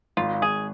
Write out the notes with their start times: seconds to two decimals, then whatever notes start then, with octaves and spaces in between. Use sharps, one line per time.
0.17 G#1 F4
0.42 G#1 G#4